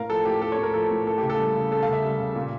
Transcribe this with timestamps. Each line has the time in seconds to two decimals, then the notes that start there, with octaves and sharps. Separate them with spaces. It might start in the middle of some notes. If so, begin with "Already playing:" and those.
Already playing: A2 A#3 A#4 F5
0.10 F3 A4
0.25 A2 G4
0.42 A#3 A4
0.52 C#5
0.58 A2 A#4
0.74 F3 A4
0.91 A2
1.07 A#3 A4
1.18 G4
1.23 C#3
1.30 A4
1.39 G3
1.55 C#3
1.71 A#3 A4
1.83 F5
1.88 C#3 E5
2.04 G3
2.19 C#3
2.35 A#2